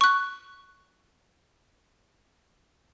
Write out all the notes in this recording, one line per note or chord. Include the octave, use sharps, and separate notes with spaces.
C#6 F#6